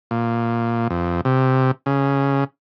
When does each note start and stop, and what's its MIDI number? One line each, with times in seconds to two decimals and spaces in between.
0.11 0.88 46
0.90 1.21 41
1.25 1.71 48
1.86 2.44 49